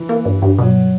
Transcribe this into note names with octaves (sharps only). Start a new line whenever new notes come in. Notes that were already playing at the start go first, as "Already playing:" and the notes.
Already playing: E3
A#3
G2
G2
B2 F#3